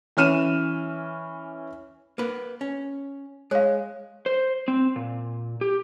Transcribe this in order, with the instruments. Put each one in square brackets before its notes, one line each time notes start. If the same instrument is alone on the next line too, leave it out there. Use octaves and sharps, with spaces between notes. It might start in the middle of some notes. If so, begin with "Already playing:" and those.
[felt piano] E3 C#4 F6 D#7 E7
[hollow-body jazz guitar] A#3 B4
C#4
[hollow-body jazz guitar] G#3 [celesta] C#5 F5
[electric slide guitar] C5
C4
A#2
G4